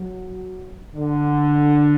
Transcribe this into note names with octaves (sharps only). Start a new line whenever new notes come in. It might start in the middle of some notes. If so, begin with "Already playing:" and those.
Already playing: F#3
D3